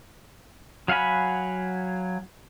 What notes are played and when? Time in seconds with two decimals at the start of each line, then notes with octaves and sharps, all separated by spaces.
0.88 F#3 F5 F#5 G#5 B5